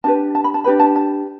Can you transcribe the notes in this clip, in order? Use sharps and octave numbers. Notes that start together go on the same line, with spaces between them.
D4 G4 B4 A5
A5
B5
A5
D4 G4 B4 B5
A5
A5